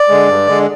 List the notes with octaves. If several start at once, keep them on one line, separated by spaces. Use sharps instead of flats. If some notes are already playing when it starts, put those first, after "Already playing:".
Already playing: D5
D3 G#3
G2
D3 G#3